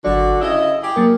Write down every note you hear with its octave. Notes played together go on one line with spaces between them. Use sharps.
G1 D3 F#3 F#4 D5
C#3 E4 D#5 E6
G4 G#4
F#3 A#3 A#4